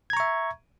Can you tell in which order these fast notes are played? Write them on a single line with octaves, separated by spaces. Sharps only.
G#6 A#5 C#6 E5